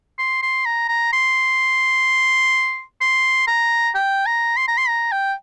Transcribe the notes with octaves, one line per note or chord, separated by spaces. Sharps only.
C6
C6
A#5
A#5
C6
C6
A#5
G5
A#5
C6
A#5
C6
A#5
G5